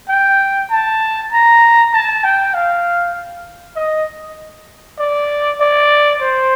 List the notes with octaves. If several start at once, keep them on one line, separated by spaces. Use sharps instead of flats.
G5
A5
A#5
A5
G5
F5
D#5
D5
D5
C5